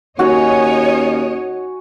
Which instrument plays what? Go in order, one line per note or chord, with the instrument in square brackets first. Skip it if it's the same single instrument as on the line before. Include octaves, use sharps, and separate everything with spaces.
[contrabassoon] D#2 [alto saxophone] C#4 [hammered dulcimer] F#4 F#5 G#5 [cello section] C#5 D#5